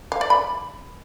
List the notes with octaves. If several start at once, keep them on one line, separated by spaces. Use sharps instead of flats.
F5
D5
B5